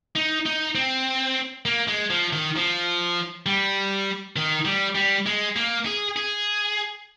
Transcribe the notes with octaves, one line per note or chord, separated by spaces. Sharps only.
D#4
D#4
C4
A#3
G#3
F3
D#3
F3
G3
D#3
G3
G3
G#3
A#3
G#4
G#4